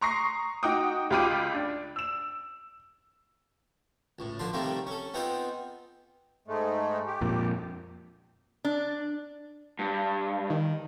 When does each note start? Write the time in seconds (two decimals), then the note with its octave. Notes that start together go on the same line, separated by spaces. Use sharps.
0.01 A#5 C6 C#6 D#6 A#6 C7
0.63 D#4 F#4 F#5 G5 D6 D#6
1.10 C#2 F4 G4 B5 D6 D#7
1.55 D4
1.96 E6 E7
4.19 C#2 A2
4.39 D3 F3 D4 C6
4.53 C3 D#3 G3 A3 A#3 C4
4.87 C#4 A4
5.14 B3 C4 D#4 F4 G#4 C5
6.48 G#2 G#3 A3
7.06 G4
7.21 F2 A#2
8.65 D4
9.79 G2
10.50 D#3